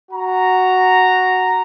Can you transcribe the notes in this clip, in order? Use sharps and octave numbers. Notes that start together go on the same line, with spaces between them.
F#4 A#5